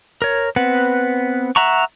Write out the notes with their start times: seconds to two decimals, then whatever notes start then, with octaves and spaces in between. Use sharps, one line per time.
0.22 A#4 C#5
0.56 B3 C4 B4 F#5
1.56 E5 F#5 A#5 C#6